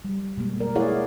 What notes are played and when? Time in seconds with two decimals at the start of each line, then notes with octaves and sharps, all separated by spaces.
0.05 G3
0.37 B2 G3 G#3 A#3
0.60 A#4 D5
0.75 E4 G#4 C#5 D5 F5 F#5